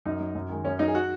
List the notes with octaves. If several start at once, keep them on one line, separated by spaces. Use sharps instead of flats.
F#2 D#4
F#3
F#2
D#3 G#3
F#2 C#4
F#3 D#4
G#4
F#4